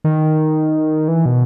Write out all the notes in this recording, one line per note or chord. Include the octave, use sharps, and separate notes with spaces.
D#3
E3
B2